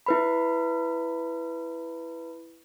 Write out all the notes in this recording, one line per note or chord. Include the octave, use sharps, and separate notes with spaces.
E4 B4 B5